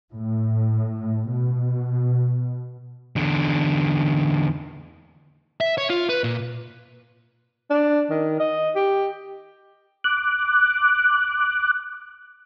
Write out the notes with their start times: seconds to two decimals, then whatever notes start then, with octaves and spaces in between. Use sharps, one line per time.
0.15 A2
1.31 B2
3.16 E2 D3
5.61 E5
5.78 C#5
5.90 F4
6.09 B4
6.24 A#2
7.70 D4
8.10 D#3
8.40 D#5
8.76 G4
10.04 D6 F#6